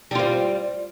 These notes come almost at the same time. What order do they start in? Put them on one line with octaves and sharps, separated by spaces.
G3 F4 C4